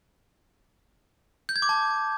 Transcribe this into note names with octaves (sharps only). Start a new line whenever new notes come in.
G6
G#6
D6
A5